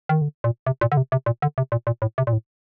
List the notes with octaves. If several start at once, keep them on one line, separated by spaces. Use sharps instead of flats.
D#3
D3
A#2
C3
A#2
D3
C3
C3
A#2
D3
C3
A#2
A#2
A2
C3
A#2
A2